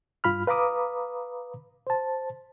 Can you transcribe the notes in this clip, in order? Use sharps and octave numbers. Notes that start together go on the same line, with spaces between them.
G2 F4 B5 F6
B4 F5 A#5 B5 D6 D#6
C5 A5